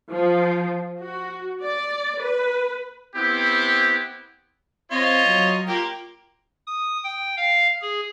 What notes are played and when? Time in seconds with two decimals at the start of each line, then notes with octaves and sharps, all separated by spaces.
0.11 F3
0.98 F#4
1.61 D5
2.21 B4
3.16 B3 C4 E4 G4
4.91 C4 F4 C#5 D#5
5.27 F#3
5.68 A#3 F4 G4 A#4
6.67 D#6
7.04 G5
7.37 F5
7.82 G#4